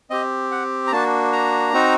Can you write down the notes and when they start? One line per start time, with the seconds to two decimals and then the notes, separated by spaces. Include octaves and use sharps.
0.10 C4 G4 D#5
0.51 F#5
0.87 A#5
0.91 A#3 D4 F#4 A5
1.33 A#5
1.74 C4 D#4 F#4